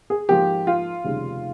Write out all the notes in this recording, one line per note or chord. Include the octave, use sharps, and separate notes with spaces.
G#4
G#2 F3 A#3 G4
F4
F1 D#2 C#3 G3